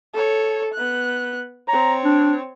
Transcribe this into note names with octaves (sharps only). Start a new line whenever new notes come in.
A4 C#5
B3 F#6
C4 C#5 A#5
D4